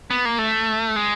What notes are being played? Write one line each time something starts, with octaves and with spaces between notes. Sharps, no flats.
B3
A#3
A3
G#3